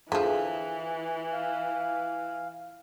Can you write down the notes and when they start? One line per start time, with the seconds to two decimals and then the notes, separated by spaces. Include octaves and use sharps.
0.12 D3 E3 F3 F4 G#4 E5
1.32 F5